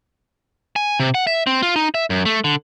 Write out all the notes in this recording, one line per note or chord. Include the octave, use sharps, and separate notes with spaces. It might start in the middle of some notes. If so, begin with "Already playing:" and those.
G#5
C3
F#5
E5
C4
F4
D#4
E5
F#2
A3
D3